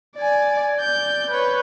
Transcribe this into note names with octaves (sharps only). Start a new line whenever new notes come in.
D5 G#5
D5 G6
B4 C#5